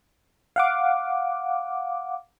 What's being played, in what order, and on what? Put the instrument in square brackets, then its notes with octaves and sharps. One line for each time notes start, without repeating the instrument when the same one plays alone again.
[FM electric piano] F5 F#5 D6